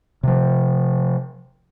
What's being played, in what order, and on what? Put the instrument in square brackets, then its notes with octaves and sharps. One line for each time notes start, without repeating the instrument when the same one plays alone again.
[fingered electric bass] C3 F3